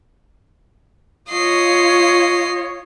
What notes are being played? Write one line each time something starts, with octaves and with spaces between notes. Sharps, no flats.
F4 C#5 D#5 C7